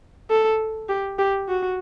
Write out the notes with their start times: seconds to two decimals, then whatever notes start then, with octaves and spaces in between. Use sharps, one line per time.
0.30 A4
0.89 G4
1.19 G4
1.49 F#4